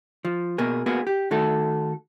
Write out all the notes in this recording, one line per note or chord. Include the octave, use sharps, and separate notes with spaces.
F3
B2 A#3 G#4
A#3 B3 F#4 G#4
G4
D#3 A3 F#4 A4